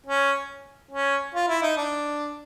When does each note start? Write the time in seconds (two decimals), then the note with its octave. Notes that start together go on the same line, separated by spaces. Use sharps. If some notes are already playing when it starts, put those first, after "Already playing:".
0.06 C#4
0.91 C#4
1.34 F4
1.48 E4
1.63 D#4
1.77 D4